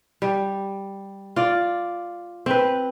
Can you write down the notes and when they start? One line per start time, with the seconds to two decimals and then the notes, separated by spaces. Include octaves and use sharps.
0.22 G3
1.36 F4 D5
2.46 C4 B4